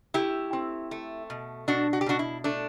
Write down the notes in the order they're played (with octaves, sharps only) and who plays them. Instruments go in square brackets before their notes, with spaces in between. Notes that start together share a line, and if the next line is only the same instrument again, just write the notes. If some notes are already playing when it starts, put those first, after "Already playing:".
[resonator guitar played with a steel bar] A3 E4 G4
C4
A3
B2
B2 D4 F#4
F#4
G4
B2 D4 F#4
E4
A3 D4